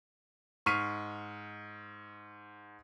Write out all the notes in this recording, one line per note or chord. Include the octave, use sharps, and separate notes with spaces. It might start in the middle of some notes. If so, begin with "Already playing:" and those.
G#2 C#6 F6 B6 C7 D#7